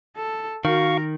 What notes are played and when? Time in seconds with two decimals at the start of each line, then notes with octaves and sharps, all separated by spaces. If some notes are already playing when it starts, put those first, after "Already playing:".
0.16 A4
0.65 D#3 F#4 A#4 F5 C#6